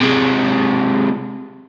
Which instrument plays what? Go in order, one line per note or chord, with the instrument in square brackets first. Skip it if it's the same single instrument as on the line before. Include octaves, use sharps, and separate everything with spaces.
[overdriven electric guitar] C3 G#3